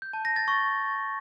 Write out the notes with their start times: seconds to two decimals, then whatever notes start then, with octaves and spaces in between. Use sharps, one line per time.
0.02 G6
0.13 A5
0.25 A#6
0.36 A6
0.48 C#6